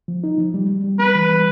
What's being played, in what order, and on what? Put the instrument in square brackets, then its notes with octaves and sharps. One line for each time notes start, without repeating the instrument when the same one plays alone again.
[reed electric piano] F3
D#4
F3
G3
G3
G3
[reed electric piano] B3 [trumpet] B4
[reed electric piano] E3
G3